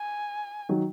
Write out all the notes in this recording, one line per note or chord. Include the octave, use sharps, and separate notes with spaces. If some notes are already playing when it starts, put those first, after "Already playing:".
Already playing: G#5
D#3 F#3